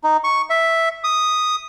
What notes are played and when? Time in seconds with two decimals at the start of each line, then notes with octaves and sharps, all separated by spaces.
0.04 D#4
0.24 C#6
0.50 E5
1.04 D#6